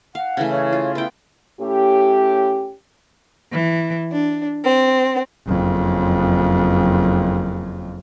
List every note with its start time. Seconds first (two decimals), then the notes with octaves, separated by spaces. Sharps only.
0.15 F5 F#5
0.37 C#3 E3 A3
0.51 C#5
0.73 F4
0.95 B3 E4 G5
1.61 A2 C#4 G4
3.52 E3
4.12 D4
4.64 C4
5.48 F#1 F2